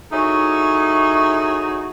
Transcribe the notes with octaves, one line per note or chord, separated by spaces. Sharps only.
D#4 E4 F#4 G#4 A4 C#5